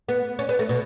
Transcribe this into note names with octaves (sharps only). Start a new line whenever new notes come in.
B3
C#4
B3
A3
B2